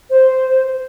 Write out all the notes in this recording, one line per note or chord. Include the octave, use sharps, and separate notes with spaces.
C5